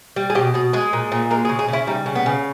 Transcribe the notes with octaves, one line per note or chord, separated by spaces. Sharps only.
G3
G#4
B2 G4
B2 G#4
G#3 G#4
A#2
A#2
G#3 A#4
G#4
C#3
G#4
C#3 E4
G3 D#4
C#3
B3
C#3